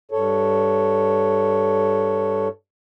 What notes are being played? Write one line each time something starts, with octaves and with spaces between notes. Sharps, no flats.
G2 A4 C#5